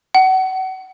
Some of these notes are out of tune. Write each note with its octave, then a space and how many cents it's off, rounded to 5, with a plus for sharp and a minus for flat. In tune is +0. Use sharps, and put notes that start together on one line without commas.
F#5 +30